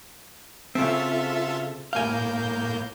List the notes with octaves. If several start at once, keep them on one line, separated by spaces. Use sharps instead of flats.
C#3 C4 F4 A4 E5
A2 A#3 F5 G#5 G6